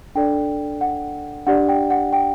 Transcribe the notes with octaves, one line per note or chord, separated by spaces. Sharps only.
D4 A4 D5 G5
F#5
D4 G4 D5 F#5
G5
F#5
G5